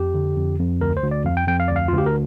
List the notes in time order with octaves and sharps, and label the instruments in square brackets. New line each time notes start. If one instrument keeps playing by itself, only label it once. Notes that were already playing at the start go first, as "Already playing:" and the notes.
Already playing: [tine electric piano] F2 G4
D3
F2
F2
D2 A#4
C5
D2
D5
F2 F5
G5
F2 G5
F5
D2 D5
F5
F4
D2
G4
A#4